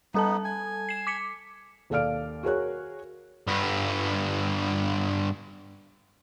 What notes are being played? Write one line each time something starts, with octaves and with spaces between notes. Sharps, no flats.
G3 B3 D#4 A4 A5
G#5
C7 E7
D6 B6 C#7
D#2 A4 D5 F5 F6 D7
F#4 G#4 A#4 C#5 F#6
G2 B3